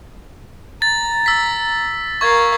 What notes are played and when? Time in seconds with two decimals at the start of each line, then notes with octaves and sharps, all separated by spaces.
0.82 A#5 A6
1.26 E6 B6
2.21 A#4 F5 C#6 G#6